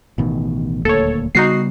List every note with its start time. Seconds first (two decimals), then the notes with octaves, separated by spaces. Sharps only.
0.18 A1 B2 D#3
0.85 D#1 D2 A#3 A4 C#5
1.35 C#3 G3 B3 D#4 F#4 C7